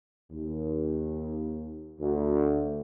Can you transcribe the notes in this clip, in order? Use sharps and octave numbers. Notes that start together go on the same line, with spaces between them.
D#2
D2